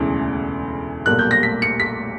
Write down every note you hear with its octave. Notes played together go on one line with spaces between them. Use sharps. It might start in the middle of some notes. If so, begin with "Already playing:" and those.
Already playing: E1 D2 C#3 E3
B1 A#2 G3 A#3 F#6
G6
A#6
B6
C#7
B6